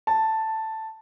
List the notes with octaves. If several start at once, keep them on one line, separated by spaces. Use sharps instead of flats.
A5